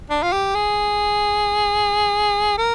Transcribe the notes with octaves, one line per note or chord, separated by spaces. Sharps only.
D4
F4
G4
G#4
A#4